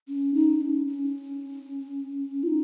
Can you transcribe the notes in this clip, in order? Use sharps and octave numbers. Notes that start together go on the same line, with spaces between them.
C#4
D#4
C#4
C#4
F4
D#4